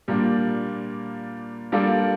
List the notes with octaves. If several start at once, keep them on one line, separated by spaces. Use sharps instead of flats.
A#2 G3 A#3 D4
G3 A#3 D4 F4 A4